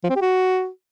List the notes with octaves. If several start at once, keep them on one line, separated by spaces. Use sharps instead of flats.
F3
C4
G4
F#4